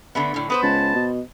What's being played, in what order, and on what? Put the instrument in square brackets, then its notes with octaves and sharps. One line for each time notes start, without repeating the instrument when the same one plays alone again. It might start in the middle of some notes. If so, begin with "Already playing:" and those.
[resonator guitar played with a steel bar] D3 A3 B3
A2 D3
[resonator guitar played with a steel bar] B3 B4 C5 [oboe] D#6
[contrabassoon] C#2 [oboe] A5
[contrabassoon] B2